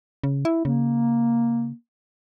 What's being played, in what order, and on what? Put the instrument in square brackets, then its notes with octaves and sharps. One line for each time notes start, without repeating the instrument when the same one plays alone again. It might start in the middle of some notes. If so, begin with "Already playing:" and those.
[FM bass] C#3
E4
[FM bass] C#3 [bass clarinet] A#3